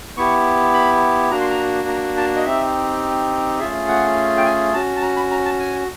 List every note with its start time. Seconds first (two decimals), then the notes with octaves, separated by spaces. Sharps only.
0.17 B3 E4 G4 C#6
0.74 B5
1.31 A#3 D4 F#4 A#5
1.40 C6
1.50 A#5
1.88 A#5
2.17 A5
2.36 D#5
2.45 C4 D#4 G4 E5
3.59 A3 C#4 F4 G#4 E5
3.88 F#5
4.37 G5
4.45 G#5
4.73 C#4 F#4 A5
4.96 A5
5.02 A#5
5.16 B5
5.31 A#5
5.45 A5
5.59 G#5